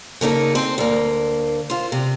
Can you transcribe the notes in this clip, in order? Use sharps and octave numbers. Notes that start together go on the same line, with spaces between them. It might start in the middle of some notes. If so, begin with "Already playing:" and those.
C#3 A#3 D#4 A4
C4 C5
D2 A#3
F4 C5
C3